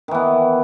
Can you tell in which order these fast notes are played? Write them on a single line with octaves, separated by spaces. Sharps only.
D#3 E3 B3